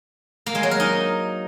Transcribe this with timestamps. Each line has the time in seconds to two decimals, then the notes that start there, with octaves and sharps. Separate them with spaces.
0.46 A#3
0.55 G#3
0.63 F#3
0.71 A#4
0.80 D#4